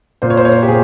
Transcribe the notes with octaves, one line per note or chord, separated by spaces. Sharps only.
A#2 C5
C#5
C5
C#5
C5
G4
A#2 G#4